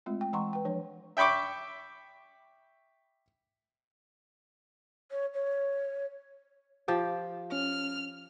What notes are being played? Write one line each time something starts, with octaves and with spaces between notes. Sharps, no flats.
G#3 A3 C4 F4
G5
E3 G#3 F#5 A#5 C6 C#6
B4 G5
F3 D4 C#5
E5 G5 B5 C#6 D6
C#5
C#5
F3 G4 G5
C#4 F6